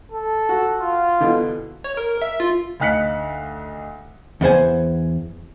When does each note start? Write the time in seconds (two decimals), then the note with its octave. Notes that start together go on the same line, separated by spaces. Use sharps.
0.12 A4
0.49 F#4
0.81 F4
1.20 B2 D3 E3
1.84 C#5
1.97 A#4
2.22 E5
2.40 F4
2.80 D2 D#4 F5 F#6 B6 C#7
4.41 E2 B3 C5 G#5